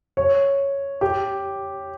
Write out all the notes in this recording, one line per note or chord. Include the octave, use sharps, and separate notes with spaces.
C#5
G4